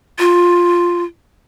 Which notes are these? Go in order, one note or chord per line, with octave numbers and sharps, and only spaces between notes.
F4